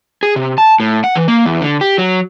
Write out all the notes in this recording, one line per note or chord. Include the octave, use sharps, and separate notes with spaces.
G#4
C3
A5
A2
F#5
E3
A#3
E2
D3
G4
F#3